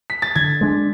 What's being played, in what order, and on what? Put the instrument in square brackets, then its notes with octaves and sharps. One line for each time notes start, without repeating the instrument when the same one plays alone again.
[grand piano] B6
A6
[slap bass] D3 [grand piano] G#6
[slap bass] G#3 D4